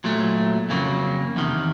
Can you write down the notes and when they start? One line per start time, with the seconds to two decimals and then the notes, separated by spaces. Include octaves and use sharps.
0.04 A#2 F#3 A3
0.70 F2 C#3 F#3 A#3
1.36 E2 C3 D#3